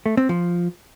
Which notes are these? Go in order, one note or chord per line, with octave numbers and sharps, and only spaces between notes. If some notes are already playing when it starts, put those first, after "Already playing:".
A3
C4
F3